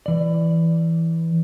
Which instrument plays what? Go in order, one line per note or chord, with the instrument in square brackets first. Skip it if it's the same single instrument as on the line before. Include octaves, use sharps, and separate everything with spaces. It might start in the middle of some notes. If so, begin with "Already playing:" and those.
[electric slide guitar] E3 D5